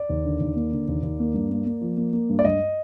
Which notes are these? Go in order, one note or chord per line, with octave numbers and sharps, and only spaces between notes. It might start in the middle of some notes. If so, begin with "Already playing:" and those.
Already playing: D5
D#2
D3
D#2
A#3
D3
D#2
D#2
A#3
G2
A#3
A#3
F3
A#3
A#3
G2
D5
G2 D#5